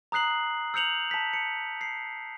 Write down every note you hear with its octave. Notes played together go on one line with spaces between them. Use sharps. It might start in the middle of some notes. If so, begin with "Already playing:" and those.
A#5 D#6 F#6 C7 F#7
E6 G6 C#7 F7 F#7
A5 B6
C#7
C7